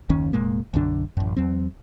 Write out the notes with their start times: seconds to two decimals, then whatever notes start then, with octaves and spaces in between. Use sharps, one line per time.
0.09 F#1 D#2 D#3 C#4
0.33 F1 A#2 G#3 A#3
0.74 B1 F#2 D3 D4
1.17 A1 F#2
1.37 E2 F#3 C4